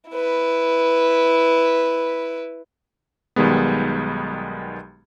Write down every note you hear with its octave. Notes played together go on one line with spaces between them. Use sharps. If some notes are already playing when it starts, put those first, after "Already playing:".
E4 B4
B1 D#3 G3 G#3 B3